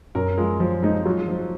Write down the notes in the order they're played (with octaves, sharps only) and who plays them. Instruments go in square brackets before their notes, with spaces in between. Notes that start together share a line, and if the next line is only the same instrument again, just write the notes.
[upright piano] F#2 [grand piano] A#4
[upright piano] F3 [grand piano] G#3
[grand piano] F3 [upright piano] F#3
[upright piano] G#3 [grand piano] D#4
[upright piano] F#3 [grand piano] F4
[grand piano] F3